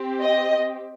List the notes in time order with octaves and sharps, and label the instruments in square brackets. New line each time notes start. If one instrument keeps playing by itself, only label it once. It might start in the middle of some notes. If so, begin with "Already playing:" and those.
Already playing: [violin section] C4 G4
D#5